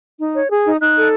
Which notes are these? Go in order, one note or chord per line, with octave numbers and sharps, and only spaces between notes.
D#4
C#5
G#4
D#4
D#4 F#6
A4